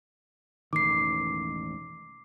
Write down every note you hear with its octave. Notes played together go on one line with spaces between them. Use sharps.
E1 A1 D#3 D6 C7